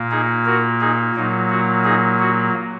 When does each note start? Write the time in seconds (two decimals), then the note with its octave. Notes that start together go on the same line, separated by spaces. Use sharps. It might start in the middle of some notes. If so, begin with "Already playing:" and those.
Already playing: A#2 A#3
0.11 D#4 G#4
0.45 F#4 A#4
0.80 D#4 G#4
1.15 A#2 F#3 A#3 D#4
1.50 F#4
1.84 D#4 G#4
2.19 F#4